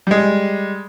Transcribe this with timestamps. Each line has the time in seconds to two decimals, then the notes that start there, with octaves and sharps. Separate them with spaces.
0.07 G3 G#3